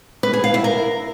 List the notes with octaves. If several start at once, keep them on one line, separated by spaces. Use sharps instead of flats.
B4
G#4
F5
E4
A#4